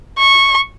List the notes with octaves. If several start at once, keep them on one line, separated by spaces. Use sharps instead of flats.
C#6